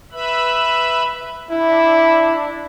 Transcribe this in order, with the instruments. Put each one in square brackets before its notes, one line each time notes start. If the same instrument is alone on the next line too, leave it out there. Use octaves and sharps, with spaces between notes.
[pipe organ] B4 E5 B5
[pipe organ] D4 [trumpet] E4